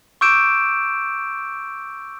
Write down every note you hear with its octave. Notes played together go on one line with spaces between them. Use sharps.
C#6 D6 E6 G6 D7 E7